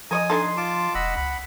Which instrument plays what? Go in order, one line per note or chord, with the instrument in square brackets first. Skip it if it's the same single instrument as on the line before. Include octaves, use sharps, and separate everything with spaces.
[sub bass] F3 [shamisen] A#4 C#5 D#5 [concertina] G#5 D#6
[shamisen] D4 D#4 A4 [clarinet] C6
[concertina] F4 A5 D6
[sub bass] E1 [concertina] D#5 B5 E6 [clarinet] F#5
[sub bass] C#2 [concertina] B5